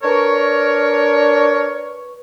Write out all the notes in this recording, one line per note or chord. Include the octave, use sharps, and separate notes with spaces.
D4 A#4 B4 C#5 C#6